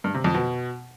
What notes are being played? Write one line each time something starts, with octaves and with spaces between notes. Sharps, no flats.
G2
C3
F2
B2